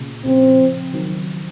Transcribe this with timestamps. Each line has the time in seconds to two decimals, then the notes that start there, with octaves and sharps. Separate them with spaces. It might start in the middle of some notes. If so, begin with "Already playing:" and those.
Already playing: A#2 C#3
0.25 C#3 F3 C4
0.94 D#3 F#3